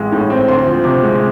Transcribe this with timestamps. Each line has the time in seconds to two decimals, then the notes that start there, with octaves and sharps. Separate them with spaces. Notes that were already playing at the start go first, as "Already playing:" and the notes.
Already playing: A1 G#3
0.12 A2
0.30 C4
0.48 D2 C6
0.67 F3
0.84 C3 D6
1.03 G#3